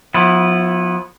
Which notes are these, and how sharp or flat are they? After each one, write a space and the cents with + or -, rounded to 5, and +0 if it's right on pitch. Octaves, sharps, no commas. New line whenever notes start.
F3 +35 B3 -5 E4 +0